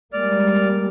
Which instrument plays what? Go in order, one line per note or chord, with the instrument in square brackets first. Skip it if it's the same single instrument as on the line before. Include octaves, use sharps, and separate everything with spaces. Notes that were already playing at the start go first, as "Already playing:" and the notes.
[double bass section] G3 G#3 A#3 [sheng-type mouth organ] D5 F6